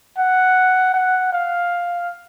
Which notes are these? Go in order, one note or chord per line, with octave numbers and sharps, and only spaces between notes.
F#5
F#5
F5